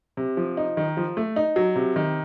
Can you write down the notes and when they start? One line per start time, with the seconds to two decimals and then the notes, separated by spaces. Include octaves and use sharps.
0.17 C3
0.37 F3
0.57 D#4
0.77 D#3
0.97 F3
1.17 A3
1.36 D#4
1.56 F#3
1.76 C3
1.96 D#3